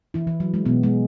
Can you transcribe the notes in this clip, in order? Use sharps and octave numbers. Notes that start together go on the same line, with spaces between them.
E3 E4
E3
F#3
G#3
B2 B3
G#3